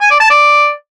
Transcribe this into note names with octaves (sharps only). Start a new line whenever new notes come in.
G#5
D5
A5
D5